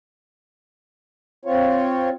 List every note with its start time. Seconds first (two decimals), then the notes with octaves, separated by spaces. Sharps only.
1.45 C4 F4 C#5